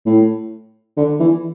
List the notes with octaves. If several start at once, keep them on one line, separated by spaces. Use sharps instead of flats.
A2
D3
E3